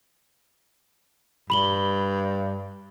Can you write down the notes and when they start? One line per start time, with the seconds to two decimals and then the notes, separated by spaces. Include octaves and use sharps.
1.50 G2 B5 F#7 G7